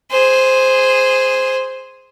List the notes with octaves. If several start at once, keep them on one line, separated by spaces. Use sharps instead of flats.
G#4 C5